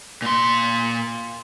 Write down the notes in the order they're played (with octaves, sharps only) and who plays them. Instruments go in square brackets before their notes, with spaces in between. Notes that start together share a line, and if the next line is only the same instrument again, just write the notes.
[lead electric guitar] A#2 C6